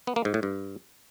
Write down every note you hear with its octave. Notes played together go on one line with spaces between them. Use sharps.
B3
A#3
G#2
A2
G2